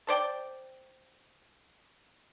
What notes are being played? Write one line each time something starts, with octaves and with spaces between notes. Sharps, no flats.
A4 C5 D5 G5